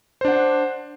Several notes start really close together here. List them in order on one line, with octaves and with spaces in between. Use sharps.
C5 D4 F#5